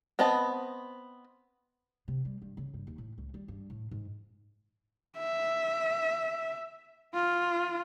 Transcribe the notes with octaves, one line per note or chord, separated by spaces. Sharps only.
B3 C4 B4 D#5 A5
C3
G3
G2
C#3
G2
D#2
A2
C#2
G3
G2
A2
G#2
E5
F4